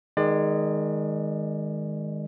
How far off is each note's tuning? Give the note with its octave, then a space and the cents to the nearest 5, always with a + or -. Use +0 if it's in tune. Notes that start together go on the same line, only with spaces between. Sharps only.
D#3 +0 G#3 +0 D5 +30